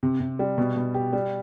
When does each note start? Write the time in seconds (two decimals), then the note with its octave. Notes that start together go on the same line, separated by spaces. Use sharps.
0.03 C3
0.20 C3
0.39 G3
0.58 B2
0.76 B2
0.94 G4
1.13 G3